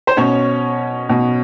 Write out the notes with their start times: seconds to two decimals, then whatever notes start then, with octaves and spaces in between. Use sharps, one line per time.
0.07 C5
0.17 B2 C#4 C#5
1.09 B2